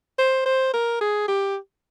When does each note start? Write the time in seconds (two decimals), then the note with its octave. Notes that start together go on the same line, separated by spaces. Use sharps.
0.19 C5
0.46 C5
0.74 A#4
1.01 G#4
1.28 G4